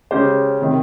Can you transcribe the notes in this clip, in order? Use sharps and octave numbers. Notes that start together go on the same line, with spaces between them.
C#3 G#3 C#4 G4 C5
C3 D#3